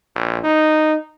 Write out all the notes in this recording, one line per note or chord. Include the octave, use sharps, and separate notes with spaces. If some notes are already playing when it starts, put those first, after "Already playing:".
A#1
D#4